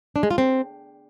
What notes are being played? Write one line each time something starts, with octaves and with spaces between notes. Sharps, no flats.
D4
G#3
F4
C4